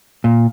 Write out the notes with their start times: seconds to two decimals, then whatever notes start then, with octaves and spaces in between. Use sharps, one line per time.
0.24 A#2